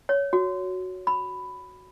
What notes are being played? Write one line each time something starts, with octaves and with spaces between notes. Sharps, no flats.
C#5
F#4
B5